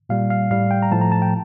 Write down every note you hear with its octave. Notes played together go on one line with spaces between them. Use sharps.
A#2 G3 F5
F5
A2 G3 F5
G5
A#5
A2 F3 A3 A5
A#5
A5
G5